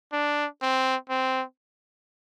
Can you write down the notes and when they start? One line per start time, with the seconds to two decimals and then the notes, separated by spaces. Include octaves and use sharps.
0.13 D4
0.62 C4
1.10 C4